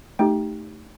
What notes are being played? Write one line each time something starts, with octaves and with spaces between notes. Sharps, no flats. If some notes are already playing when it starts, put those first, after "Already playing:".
A3 D#4 G4 G5